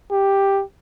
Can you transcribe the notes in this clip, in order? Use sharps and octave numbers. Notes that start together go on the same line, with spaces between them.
G4